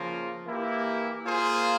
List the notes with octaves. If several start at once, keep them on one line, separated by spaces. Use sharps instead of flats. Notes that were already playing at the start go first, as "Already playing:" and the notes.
Already playing: C#3 F3 A#3 F4
E3 A#3 E4 G4
A#3 F4 G#4 C5